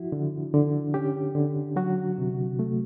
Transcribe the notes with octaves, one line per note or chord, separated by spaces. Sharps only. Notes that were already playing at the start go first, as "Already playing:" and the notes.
Already playing: F3 E4 F#4
D3
D3
C#4 G4
D3
F#3 F#4
C3
A3